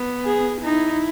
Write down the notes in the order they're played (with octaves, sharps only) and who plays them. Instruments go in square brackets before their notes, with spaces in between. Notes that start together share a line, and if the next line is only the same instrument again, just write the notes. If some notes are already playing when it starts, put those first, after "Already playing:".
Already playing: [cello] B3
[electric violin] G#4
[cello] D#4 [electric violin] E4